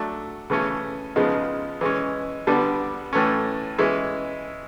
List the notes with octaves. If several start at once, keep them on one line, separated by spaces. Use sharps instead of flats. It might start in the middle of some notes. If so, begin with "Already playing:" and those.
Already playing: F#3 A3 D4
C#3 E3 A3 C#4
C#3 F3 G#3 B3 D#4
E3 G#3 C#4
D3 G3 B3 D4
A2 E3 A3 C#4
E3 G#3 C#4 E4